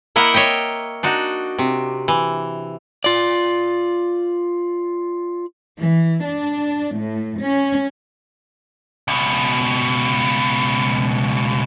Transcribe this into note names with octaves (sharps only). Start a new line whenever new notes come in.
A#3 E4 A#4 D#5 F#5
C#5 D#5 E5 G5
D4 D#4 F#4
C3
E3
F4 D5
E3
D4
A2
C#4
C#2 B2